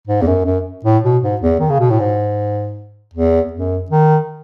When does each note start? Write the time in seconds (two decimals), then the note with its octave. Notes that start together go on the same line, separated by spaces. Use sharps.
0.07 G#2
0.21 E2
0.27 F#2
0.45 F#2
0.84 A2
1.04 B2
1.23 G#2
1.41 E2
1.60 D#3
1.70 C#3
1.80 B2
1.90 A2
2.00 G#2
3.13 E2
3.53 F#2
3.90 D#3